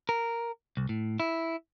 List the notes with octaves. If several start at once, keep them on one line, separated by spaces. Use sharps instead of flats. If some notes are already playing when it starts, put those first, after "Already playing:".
A#4
C2
A2
E4